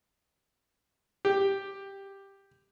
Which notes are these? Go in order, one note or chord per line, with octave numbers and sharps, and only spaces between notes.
G4